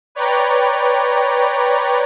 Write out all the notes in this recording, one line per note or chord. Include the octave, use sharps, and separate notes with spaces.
B4 C#5 D5 G5 A#5